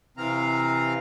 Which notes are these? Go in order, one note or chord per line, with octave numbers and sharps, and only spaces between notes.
C3 E3 C4 F5 A#5